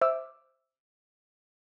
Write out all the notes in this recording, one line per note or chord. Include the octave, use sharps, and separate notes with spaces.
C5 E5 D6 E6 F6